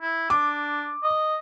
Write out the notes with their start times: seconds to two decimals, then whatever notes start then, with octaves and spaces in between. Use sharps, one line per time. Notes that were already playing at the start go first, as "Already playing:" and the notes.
0.02 E4
0.30 D4 D6
1.03 D#5